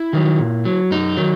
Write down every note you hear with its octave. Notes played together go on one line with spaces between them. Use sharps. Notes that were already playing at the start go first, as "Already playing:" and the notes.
Already playing: E4
D#3 F#3
A#2
F#3
F#2 D#4
D#3 F#3